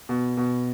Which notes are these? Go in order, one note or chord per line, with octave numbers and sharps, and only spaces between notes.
B2
B2